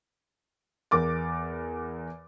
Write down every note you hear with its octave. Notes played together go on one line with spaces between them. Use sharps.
E2 A#4 D6 A6